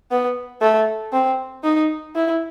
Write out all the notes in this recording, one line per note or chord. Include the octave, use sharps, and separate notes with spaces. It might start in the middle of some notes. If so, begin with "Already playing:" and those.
B3
A3
C4
D#4
E4